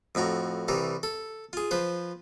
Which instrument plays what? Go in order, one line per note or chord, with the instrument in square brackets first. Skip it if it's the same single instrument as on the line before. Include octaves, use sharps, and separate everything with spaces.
[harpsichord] F2 A2 F#4 A#5
C2 E3 G3 A#5
A4
F4 G#4
F3 B4 C5